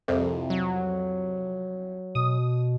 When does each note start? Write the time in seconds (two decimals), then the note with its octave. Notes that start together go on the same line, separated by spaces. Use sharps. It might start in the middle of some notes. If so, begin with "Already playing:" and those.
0.08 C2 F2 C3
0.50 F#3
2.15 B2 D#6